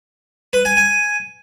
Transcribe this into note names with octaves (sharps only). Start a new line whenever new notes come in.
B4
G#5
G#5